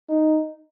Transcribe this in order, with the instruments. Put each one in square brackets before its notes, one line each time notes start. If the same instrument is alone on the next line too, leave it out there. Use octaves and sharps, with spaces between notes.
[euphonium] D#4